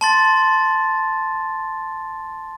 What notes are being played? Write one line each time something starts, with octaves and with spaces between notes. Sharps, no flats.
A5 C6 A6